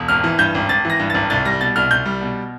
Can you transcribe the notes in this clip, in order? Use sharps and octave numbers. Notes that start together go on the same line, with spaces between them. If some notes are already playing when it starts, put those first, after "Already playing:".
Already playing: E1
G#1 F6
E3
G2 G6
G#1
G#1 A6
E3
A#6
G2
G#1 A6
C2 A6
G3 A#6
B2 A6
C2 F6
C2 G6
G3
B2